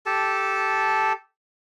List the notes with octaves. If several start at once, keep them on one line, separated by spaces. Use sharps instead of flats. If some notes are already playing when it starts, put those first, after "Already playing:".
G4 A4 A5